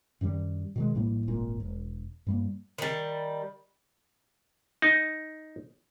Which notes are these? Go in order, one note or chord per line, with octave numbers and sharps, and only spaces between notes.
F#2 D#3 E3 G3
B2 D#3 G#3
A#1 A2 G3 A#3
D#1 G#1 A#2
E1
G2 G3 A#3
D#3 G3
D#4